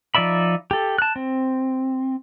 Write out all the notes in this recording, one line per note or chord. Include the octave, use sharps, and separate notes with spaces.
F3 D#4 D5 E5 B5
G4 A4
A5 F#6
C4